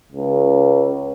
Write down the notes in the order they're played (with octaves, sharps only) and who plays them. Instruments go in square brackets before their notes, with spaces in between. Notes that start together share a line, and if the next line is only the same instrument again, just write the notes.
[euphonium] C#2